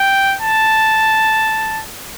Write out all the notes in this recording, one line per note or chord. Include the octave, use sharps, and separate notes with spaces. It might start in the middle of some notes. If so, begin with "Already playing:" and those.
Already playing: G5
A5